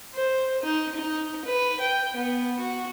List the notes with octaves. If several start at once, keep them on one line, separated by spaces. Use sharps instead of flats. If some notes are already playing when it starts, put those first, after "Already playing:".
C5
D#4
D#4
B4
G5
B3
F#4